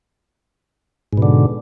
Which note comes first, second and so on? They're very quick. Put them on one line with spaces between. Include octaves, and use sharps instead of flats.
G#2 B2 D3